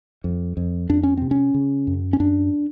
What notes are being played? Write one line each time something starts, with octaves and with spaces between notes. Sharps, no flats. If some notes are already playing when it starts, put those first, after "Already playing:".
F2
F2
F2 D4
C#4
C3 C4
C#4
C#3
F#2
C#4
F#2 D4